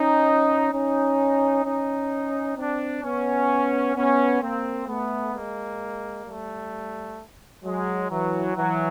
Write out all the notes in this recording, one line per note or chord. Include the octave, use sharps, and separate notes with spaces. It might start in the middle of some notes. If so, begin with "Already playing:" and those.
Already playing: C#4 D#4
C#4 D#4
C#4 D#4
C4 D4
B3 C#4
B3 C#4
A#3 C4
A3 B3
G#3 A#3
G3 A3
F#3 G#3
E3 F#3
E3 F#3